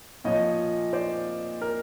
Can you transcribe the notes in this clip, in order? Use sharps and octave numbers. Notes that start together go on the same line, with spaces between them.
A#2 F3 A#3 C#5 D#5
C5 D5
A#4